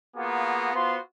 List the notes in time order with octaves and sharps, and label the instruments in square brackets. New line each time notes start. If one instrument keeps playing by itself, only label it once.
[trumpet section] A#3 B3 F4 F#4 G#4 A#5
B3 F4 F#4 C5 C6